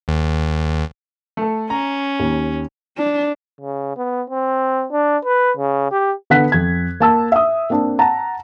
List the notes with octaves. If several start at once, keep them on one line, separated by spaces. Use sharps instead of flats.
D#2
A3 A4
C#4 A#5
D#2
D4
C#3
B3
C4
D4
B4
C#3
G4
D3 B3 F#5 F#6 B6
F2 G#6
A#3 A5 E6
E5 D#6
A#3 C4 D4
F#5 A5 A#5